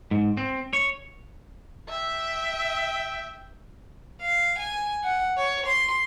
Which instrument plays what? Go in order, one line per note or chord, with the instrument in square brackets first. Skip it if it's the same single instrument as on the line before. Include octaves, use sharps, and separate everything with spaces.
[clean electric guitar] G#2
C4
C#5
[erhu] E5 [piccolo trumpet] G5
[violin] F5
G#5
F#5
C#5
C6